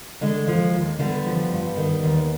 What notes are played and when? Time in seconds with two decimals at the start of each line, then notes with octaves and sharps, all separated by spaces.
0.21 D3 G#3
0.47 F3
0.74 D#2
0.99 D3 G3 B3
1.26 F3
1.51 G2
1.77 D#3
2.03 D#2